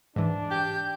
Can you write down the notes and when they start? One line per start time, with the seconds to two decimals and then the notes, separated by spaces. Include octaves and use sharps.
0.16 G#2 E3 D4
0.51 G4 G6